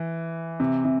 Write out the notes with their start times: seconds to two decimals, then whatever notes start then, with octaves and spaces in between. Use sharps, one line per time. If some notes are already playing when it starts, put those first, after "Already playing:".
Already playing: E3
0.60 C3
0.85 C3